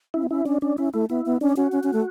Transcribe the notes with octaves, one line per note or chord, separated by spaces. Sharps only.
C#4 E4
B3
C#4 E4
C#4 D4
C#4 D4
C#4 E4
A3 E4
B3 E4
B3
C#4 D4
C#4 F#4
C#4
C#4
A3